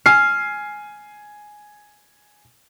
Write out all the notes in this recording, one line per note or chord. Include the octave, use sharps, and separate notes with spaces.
G#5 F6 C7